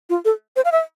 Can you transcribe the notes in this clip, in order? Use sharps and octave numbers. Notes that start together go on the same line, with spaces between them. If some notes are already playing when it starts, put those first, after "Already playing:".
F4
A4
C5
F5
E5